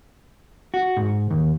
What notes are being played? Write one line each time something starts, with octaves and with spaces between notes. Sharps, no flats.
F#4
G#2
D#2